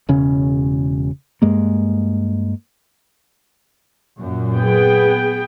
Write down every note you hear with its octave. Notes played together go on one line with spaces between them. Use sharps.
E1 C#3 C#4
G2 G#3 A#3
F#2 A#2
B3 G#4 G5